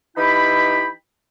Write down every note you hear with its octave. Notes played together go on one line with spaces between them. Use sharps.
E3 D#4 E4 G4 G5 B5